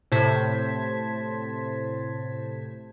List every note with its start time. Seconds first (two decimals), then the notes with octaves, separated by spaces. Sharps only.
0.12 A2 C3 C5 A5 G#6 B6